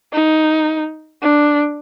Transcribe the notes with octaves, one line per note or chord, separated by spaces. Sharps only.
D#4
D4